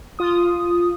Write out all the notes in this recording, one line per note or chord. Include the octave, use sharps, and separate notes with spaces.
F4 D#6